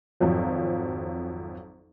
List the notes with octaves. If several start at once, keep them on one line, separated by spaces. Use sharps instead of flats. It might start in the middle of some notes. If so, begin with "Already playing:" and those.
G#1 F2 F3 F#3